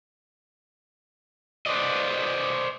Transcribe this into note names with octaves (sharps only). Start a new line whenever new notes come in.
B4 C5 D5 D#5